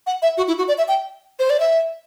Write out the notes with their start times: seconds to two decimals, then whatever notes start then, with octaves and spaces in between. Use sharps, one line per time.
0.07 F#5
0.22 E5
0.38 F#4
0.48 E4
0.58 F#4
0.68 D5
0.78 E5
0.88 G5
1.39 C5
1.50 D5
1.60 E5